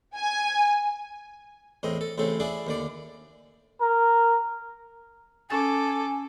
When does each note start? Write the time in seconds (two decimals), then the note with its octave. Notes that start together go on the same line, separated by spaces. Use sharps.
0.15 G#5
1.83 E2 A2 C4 D#5
2.01 A4
2.18 A1 A2 C#3 C4 A4
2.40 D4 E4 G#4 D5
2.67 D#2 D3 D5
3.81 A#4
5.50 C#4 A4 G#5 D6 A6